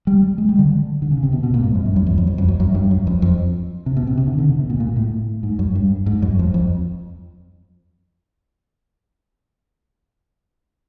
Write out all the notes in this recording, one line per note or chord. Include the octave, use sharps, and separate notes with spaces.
G3
G#3
G3
D3
D3
C#3
C3
B2
B2
A#2
G#2
F#2
G2
F#2
E2
F2
F#2
F2
F#2
F#2
G2
F#2
F2
F2
C3
B2
C3
C3
D3
D3
C3
B2
A#2
A#2
A2
G#2
F#2
G2
G#2
F#2
F2
F2